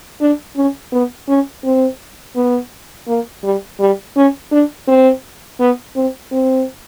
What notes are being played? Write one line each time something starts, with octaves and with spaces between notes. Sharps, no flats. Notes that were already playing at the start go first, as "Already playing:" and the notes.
D4
C#4
B3
C#4
C4
B3
A#3
G3
G3
C#4
D4
C4
B3
C4
C4